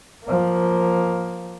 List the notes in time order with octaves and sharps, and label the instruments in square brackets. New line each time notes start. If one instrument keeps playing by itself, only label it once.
[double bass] F3 A#3